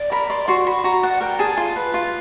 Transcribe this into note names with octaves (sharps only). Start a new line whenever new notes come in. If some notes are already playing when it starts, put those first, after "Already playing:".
Already playing: D5
A#4 B5
D5 C6
F#4 C6
F#4 B5
F#4 A#5
D5 F#5
A#4 G5
G#4 A5
F4
B4
F4